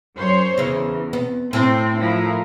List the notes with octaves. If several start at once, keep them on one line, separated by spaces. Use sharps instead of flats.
F#2 C5 C#5
E2 C#3 E3
B3
A2 C4
F3 E4 A#4